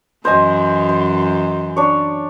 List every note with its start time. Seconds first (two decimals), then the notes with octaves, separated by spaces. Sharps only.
0.25 F#2 E3 C5 D#5 G#5
0.89 C5
1.77 D4 C#5